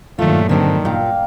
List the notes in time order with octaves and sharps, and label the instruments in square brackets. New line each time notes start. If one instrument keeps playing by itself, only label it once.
[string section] G2 A#2 F#3 [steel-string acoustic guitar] D#3 F4 [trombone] A3
[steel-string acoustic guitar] D3 C4 G4 [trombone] D#3 [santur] D4 A4
[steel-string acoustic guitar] A#2 [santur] A#3 F5 G5